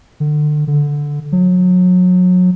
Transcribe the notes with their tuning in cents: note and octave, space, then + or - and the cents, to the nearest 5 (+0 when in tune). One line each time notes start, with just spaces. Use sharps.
D3 +30
D3 -10
F#3 -30